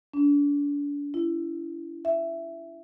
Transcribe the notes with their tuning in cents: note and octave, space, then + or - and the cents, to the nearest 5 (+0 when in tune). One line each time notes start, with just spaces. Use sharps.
D4 -35
E4 +30
E5 +10